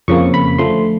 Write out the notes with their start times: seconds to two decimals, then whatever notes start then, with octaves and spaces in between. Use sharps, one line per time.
0.08 F2 C#3 F3 A#3 C#6
0.34 B5
0.58 D3 F3 A3 C6